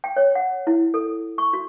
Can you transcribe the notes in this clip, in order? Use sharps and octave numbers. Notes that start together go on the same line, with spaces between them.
G5
C#5
F#5
E4
A4
C#6
F#4